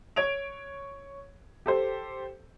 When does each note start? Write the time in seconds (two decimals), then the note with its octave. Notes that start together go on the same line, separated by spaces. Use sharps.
0.16 C#5 G#6 D7 F7
1.66 G4 A4 C5